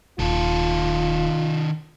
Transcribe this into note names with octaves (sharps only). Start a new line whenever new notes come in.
D#1 D#3 F4 A4